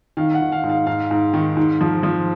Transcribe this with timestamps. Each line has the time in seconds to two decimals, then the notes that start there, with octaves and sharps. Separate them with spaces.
0.17 D#3 F5
0.34 F#5
0.41 D#3
0.52 F5
0.64 G#2
0.70 F5
0.87 G#2 F5
1.11 G#2
1.33 D#3
1.57 G#2
1.81 F3
2.03 F3